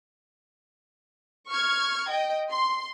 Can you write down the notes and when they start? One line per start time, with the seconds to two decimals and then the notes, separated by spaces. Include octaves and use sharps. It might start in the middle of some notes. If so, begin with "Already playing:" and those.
1.50 C#6 F6 G#6
2.09 D#5 G5
2.50 C6